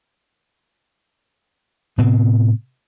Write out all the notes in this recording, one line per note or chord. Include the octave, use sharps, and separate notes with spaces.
A2 C3 B3 C4